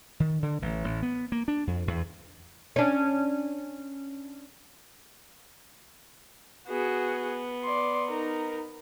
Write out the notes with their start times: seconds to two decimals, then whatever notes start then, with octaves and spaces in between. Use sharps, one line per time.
0.20 D#3
0.43 D3
0.62 A1
0.84 A1
1.02 B3
1.32 A#3
1.48 D4
1.67 F2
1.88 E2
2.76 C#4 D4
6.68 B3 F#4 G#4
7.64 D5 C6
8.09 D#4 A#4